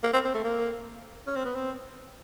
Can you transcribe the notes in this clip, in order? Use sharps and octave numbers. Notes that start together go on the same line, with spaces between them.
A#3
C4
C4
A3
A#3
C#4
C4
B3
C4